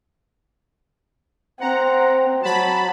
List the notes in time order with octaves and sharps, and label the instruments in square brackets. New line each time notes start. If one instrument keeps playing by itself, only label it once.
[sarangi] C4 [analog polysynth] F#5 A#5
[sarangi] F#3 [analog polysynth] A5 B5